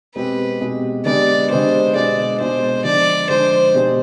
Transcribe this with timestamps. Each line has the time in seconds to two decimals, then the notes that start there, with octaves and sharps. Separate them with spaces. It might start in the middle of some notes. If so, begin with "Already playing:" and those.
0.15 B2 G#3 C4 G4 B4
0.61 B2 G#3 C4 G4
1.05 D3 G#3 B3 D4 G4 D5
1.50 D3 G#3 B3 D4 G4 C5
1.94 B2 G#3 D4 D5
2.40 B2 G#3 D4 C5
2.84 D3 F3 G#3 D4 D5
3.29 D3 F3 G#3 D4 C5
3.74 B2 G#3 D4 G4